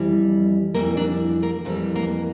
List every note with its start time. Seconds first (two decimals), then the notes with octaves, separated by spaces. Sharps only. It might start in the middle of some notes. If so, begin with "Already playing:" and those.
Already playing: F2 E3 G3
0.75 F2 E3 G3 A#3 A#4
0.97 D4 D5
1.42 A#3 A#4
1.65 F2 E3 G3 A3 A4
1.96 A#3 A#4